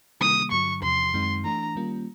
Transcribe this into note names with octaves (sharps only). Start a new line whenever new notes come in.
C3 D#3 G3 A#3 D#6
G2 D3 F#3 C#6
E2 C3 F3 C6
F#2 D#3 G#3 C4 D#4
E3 A3 D4 A#5
D#3 G3 A#3 C#4 F4